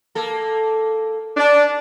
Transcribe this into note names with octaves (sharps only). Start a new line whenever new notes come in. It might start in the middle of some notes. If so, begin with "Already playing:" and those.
A#3 A4
D4